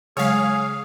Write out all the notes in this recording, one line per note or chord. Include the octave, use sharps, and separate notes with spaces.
C#3 F#3 G#3 G#4 C#5 F5